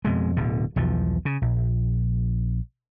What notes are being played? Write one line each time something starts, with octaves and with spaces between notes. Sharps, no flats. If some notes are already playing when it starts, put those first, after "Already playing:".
F2 B2 G#3
D1 B2 D3
B1 E2 F3
C#3
A#1